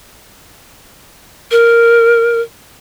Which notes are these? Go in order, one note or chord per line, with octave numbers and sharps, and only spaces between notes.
A#4